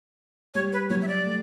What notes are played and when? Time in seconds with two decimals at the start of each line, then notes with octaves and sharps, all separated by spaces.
0.54 G3 C#5
0.73 B4
0.90 F#3 C#5
1.02 E5
1.08 D5
1.25 A3